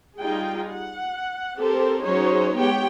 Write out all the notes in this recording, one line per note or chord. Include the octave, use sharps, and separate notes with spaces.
G3 D#4 F4 G#4 G5
F#5
C4 G4 A4 A#4 C5
F#3 C#4 D#4 G#4 C5 C#5
G#3 B3 G4 C#5 G5